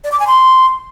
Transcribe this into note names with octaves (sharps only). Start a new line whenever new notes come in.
D5
D6
G#5
C6